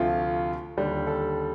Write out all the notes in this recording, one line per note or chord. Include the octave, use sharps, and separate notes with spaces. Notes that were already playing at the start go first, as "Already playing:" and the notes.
Already playing: D2 C3 F3 A3 F4
D#2 D3 G3
A4